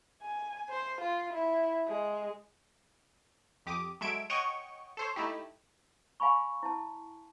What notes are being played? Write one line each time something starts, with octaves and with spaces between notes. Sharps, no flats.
G#5
C5
F4
E4
G#3
F2 G4 D6 D#6
F#3 G#3 A4 E5 G#6 D7
C#5 D#5 F#5 G5 C#6
A4 C5 C#5
A3 D#4 E4 G4
F5 G#5 B5 C#6
E4 A5